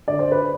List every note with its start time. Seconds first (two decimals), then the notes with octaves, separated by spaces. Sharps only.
0.08 D3 D5
0.19 C5
0.32 B4